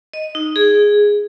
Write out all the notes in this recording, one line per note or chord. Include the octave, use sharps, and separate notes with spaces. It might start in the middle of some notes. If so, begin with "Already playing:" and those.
D#5
D#4
G#4